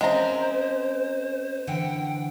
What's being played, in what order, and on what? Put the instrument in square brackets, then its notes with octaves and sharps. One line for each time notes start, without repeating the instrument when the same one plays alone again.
[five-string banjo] G#3 A#5 [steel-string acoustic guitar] C4 C#4 A#4 [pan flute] C5
[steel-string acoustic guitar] D3 E3 F#5 [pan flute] G5